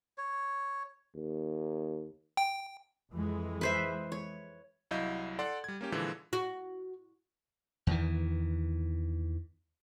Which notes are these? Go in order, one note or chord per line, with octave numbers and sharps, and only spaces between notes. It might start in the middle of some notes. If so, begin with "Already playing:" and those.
C#5
D#2
G5
F2 E3 G#3
B4 C5 E5
C#5
C2 F#3 E4 D#5 F5 G6
A4 D5 F#5 C6
G3 G#6
A#3 C#4 G4
A#2 D3 E3 F3 G#3
F#4
E2 D#3 E3